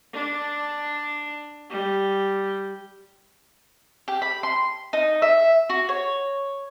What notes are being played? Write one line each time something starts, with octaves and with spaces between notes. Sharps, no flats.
D4
G3
G4
B5
C6
D#4
E5
F#4
C#5